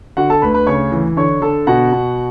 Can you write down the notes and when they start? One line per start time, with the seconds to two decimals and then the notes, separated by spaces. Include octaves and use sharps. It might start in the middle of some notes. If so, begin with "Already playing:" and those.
0.17 D3 F#4 F#5
0.30 A4 A5
0.42 D2 B4 B5
0.54 B4 B5
0.67 C#3 C#5 C#6
0.92 E3
1.17 D3 C#5 C#6
1.42 D3 A4 A5
1.67 B2 F#4 F#5
1.92 B2